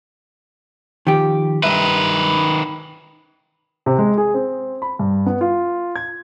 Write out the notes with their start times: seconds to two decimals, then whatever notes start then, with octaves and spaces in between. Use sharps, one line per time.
1.07 D#3 F3 G4
1.64 G2 D#3 B4 E5
3.86 C3
3.98 G#3
4.18 G#4
4.34 C4
4.82 B5
4.99 G2
5.26 B3
5.41 F4
5.96 G#6